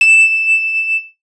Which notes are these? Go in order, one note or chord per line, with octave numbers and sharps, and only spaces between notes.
E7